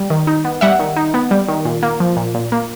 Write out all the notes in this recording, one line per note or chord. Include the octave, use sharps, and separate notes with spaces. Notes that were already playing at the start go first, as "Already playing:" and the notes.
Already playing: G3
D#3
D#4
B3
G3 E5 F#5
D#3
D#4
B3
G3
D#3
A#2
A#3
F3
A#2
A#2
A#3